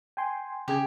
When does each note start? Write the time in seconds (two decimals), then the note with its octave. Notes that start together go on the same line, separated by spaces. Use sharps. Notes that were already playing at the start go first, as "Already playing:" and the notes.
0.17 G5 G#5 C6
0.68 C#3 G4 G#4 G#6